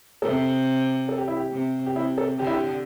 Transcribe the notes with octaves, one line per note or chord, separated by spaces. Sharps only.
C3 A4
A4
G4
E4
G4
C3
G4
C3 E4
A4
D3 G4
E4
G4